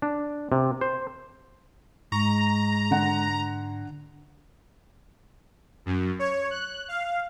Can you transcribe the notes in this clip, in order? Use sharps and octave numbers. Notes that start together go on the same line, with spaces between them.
D4
C3
C5
G#2 G#3 A#5 C#6
D3 F#5
F#2
C#5
F#6
F5